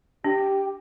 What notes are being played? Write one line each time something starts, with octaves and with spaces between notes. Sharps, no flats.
D4 G4